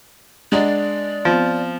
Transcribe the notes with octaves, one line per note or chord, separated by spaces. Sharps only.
G#3 D4 D5 F#5 A#5
F3 B3 C4